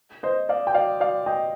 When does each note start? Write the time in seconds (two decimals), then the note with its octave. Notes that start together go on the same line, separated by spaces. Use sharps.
0.23 C5 D#5
0.49 D5 F5
0.67 G5
0.74 D5 F5
1.00 D5 F5
1.26 D#5 G5